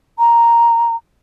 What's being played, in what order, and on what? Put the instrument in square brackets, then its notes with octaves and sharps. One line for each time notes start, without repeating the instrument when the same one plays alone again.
[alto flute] A#5